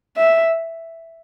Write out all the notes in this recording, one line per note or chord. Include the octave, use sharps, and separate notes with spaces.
E5